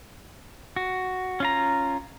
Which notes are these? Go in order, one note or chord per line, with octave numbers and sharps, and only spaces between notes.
F#4
C#4 F4 A#5